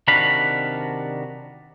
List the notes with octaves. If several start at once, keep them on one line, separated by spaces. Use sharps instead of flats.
C3 D#3 D4 F#4 F5 B5